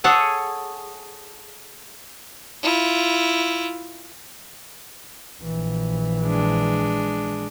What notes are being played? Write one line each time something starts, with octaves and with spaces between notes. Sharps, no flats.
G#4 A4 C#5 F#5 G#5
E4 F4
A#1 E3
G#3 D4